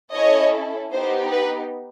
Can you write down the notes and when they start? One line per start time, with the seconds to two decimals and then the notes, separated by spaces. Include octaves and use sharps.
0.14 C#4 E4 A4 C#5 D#5
0.92 B3 D#4 G4 C5
1.32 B4